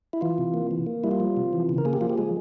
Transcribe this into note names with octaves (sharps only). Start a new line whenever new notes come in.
E4
E3 F4
C3
A#3
E3
A#3
G3 E4
F4
F3
C3
E3
C#3
A#4
A#3 G#4
G4
F3 F4
G4
G#3 G#4